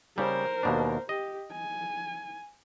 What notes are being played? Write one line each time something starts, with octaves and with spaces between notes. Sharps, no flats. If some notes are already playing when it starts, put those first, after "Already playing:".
C#3 G3 A#4 C5
D#2 B2 D4
G4 D#5
G#5